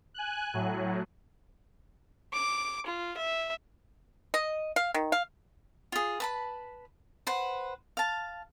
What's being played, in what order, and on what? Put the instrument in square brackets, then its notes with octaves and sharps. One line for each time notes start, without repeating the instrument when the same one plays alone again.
[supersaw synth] G#5 F#6
A2 F#3
[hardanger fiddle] D6
F4
E5
[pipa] D#5
F5
D#3
F5
[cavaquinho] F4 G#4
B4 A5 B5
B4 C5 F#5
F5 A5